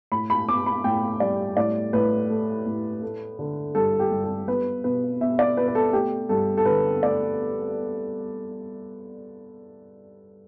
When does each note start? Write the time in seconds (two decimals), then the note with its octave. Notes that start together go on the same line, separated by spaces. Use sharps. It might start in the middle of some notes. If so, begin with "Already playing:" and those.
0.12 A2 B5
0.30 B5
0.48 B3 D6
0.66 B5
0.84 A2 G5
1.20 G3 D5
1.57 A2 D5
1.93 A2 B4
2.29 A3
2.66 A2
3.02 A3
3.39 D3
3.75 G2 A4
3.99 G4
4.11 G2
4.24 A4
4.48 B3 B4
4.84 B2 B4
5.21 B2 E5
5.39 D5
5.57 B2 B4
5.68 B4
5.75 A4
5.93 A3 G4
6.29 G2 A4
6.57 A4
6.65 D3 B4
7.02 A3 D5